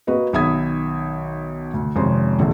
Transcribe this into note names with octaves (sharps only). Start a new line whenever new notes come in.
A#3 F#4 B4 D#5
B1 D#3 E5 B5 D#6 G#6
D2
G#1 F2 C3 C#4 C6
A#1 D3